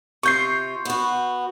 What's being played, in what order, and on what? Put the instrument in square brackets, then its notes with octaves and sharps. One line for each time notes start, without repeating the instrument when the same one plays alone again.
[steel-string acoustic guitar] C3 F4 [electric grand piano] C#6 G6 C7
[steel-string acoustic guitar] B3 F#4